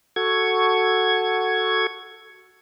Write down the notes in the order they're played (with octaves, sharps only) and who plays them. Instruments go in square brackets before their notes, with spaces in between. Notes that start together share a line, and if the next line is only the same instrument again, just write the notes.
[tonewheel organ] F#4 A4 C#6 G#6